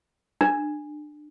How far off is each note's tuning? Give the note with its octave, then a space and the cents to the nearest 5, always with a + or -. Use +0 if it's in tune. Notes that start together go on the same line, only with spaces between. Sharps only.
D4 +25